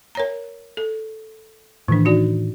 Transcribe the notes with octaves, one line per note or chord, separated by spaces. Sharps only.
A#4 C#5 A#5
A4
A2 D#3 E3 D4
D#4 F#4 D5